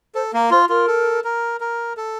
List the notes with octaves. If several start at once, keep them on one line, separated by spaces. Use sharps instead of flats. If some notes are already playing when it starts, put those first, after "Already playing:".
A4 C5
A#3 A#4
F4 C5
F4 A#4
A4
A#4
A#4
A4